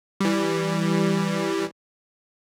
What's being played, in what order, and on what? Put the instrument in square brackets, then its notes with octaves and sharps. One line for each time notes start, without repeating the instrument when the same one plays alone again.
[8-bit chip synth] E3 G3